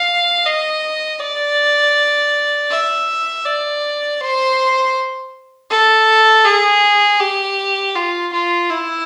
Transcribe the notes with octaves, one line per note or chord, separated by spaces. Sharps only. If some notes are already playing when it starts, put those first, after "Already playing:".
Already playing: F5
D#5
D5
E5
D5
C5
A4
G#4
G4
F4
F4
E4